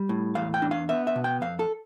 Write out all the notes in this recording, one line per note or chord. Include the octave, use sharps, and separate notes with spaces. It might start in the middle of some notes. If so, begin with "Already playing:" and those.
Already playing: G3
A2
E2 F5
G5
D4
F5
B3 E5
E5
B2
G5
F2 F5
A4